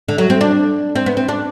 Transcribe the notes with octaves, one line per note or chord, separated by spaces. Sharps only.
D3
F#3
C4
D4
C4
B3
C4
D4